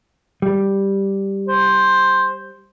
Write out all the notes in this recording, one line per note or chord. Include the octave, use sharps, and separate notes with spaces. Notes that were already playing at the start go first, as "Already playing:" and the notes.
G3
C5